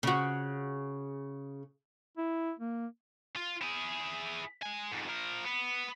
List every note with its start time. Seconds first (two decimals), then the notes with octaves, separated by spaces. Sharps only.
0.03 C#3 F#4
2.17 E4
2.59 A#3
3.36 F4
3.62 E4 G#4
4.62 G#3 G#5
4.91 F2 G#2
5.08 F3 A#4
5.44 B3